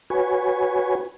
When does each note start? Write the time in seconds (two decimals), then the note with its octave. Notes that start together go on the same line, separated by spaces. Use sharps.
0.10 F#4 B4 C#5 G#5